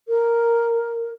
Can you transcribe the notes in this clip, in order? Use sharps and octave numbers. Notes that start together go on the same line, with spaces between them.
A#4